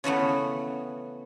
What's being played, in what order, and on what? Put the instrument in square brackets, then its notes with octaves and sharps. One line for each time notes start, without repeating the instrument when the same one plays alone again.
[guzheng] C#3 E3 A3 B3